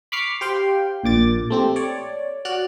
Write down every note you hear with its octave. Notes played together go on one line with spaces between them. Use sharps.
B5 C#6 D6 F6 C7
G4 C5 F5 G5
A#1 A#2 D6 A6
A3 C4 G4
C#5 D5
F#4 D5 F6 F#6